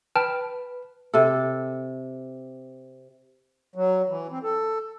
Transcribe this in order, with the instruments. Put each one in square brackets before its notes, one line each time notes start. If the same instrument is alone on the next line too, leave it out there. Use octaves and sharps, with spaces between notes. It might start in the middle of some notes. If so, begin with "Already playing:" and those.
[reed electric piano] B4 [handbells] G5 A5 F6
[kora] C3 A4
[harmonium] F#3
E3
C4
A4